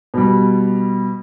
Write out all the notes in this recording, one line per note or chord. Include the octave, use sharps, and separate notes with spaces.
B2 G3